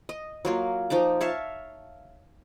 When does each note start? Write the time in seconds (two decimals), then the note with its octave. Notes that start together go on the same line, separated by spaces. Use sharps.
0.09 D#5
0.45 F#3 A#3 F4
0.90 F3 D#4 A#5 D6
1.21 C#5 E5 F5 A5